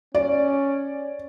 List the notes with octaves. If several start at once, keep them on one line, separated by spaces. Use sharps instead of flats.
C#4 D5